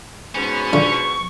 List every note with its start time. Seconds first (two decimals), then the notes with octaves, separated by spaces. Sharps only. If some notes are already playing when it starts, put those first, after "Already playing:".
0.35 G#2 B2 C#4
0.73 D3 D4 F4 C#6